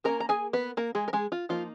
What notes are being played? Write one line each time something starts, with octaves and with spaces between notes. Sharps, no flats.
D#3 A#3 C#4 A#4 A#5
A#5
G#4 G#5
B3 B4
A#3 A#4
G#3 G#4
A#4
G#3 G#4
F4
F3 A#3 D#4 F4